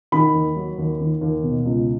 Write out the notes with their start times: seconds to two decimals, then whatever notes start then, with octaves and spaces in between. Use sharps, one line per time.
0.12 D#3 B5
0.34 D#2
0.56 F#3
0.78 D#2
1.00 D#3
1.21 D#2
1.43 B2
1.65 C#2